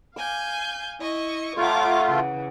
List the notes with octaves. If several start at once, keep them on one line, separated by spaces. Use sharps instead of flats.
F5 G#5 D6 G6
E4 D#5 C#6
A3 F4 C#5 F#5 A#5 D6 E6
C#3 E3